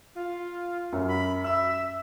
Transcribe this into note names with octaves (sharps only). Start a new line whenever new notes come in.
F4
F#2
B5
E5 E6